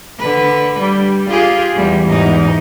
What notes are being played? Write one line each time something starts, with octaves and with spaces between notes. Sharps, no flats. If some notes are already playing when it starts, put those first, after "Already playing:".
D3 B4
G3
F4 G4 G#4
E2 G3
E2 G#2 D#4